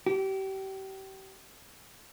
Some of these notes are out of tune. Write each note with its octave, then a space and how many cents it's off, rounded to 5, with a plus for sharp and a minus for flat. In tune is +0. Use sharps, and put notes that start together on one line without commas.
G4 -30